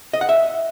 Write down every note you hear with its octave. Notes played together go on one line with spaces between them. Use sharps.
D#5
F#5
E5